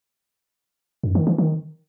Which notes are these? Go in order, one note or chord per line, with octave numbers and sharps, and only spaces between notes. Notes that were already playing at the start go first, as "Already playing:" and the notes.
F#2
D#3
E3
D#3